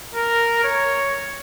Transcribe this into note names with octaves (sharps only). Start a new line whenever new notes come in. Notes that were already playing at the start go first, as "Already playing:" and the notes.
A#4
C#5